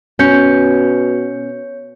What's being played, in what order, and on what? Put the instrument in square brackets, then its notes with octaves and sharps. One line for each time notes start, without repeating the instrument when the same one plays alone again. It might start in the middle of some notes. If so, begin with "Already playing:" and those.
[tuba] B2 [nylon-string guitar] C#4 [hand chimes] C#5 G6 C#7